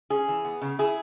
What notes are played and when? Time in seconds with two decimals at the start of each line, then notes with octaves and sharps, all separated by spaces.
0.10 C#4 G#4
0.28 E3
0.45 B3
0.62 C#3
0.79 E4 G#4